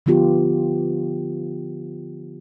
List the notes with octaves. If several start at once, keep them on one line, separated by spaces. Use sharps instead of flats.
D3 F3 B3 F4 G4